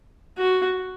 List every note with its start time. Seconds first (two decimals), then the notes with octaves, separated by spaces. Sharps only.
0.37 F#4